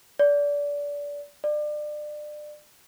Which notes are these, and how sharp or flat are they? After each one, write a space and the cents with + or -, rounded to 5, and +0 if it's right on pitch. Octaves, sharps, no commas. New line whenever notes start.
D5 -25
D5 +30